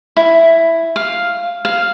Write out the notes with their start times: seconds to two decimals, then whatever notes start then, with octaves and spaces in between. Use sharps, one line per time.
0.17 E4
0.96 F5
1.65 F5